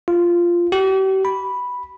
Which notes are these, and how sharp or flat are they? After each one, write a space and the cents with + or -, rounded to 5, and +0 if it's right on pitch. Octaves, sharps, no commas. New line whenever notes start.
F4 -10
G4 -40
B5 -5